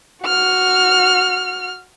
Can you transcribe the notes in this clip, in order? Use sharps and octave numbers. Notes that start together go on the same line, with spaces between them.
F#4 F6